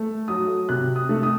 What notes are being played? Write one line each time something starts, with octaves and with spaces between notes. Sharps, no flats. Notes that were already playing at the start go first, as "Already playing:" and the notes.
Already playing: A3
F#3 D#6
C3 F#6
D#6
A3
D#6